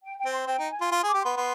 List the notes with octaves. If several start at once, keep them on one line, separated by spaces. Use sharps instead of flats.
G5
G5
C4
C6
C4 G5
D#4
G#5
F4
F4 C6
G#4 D6
G4
B3 C6
B3 C6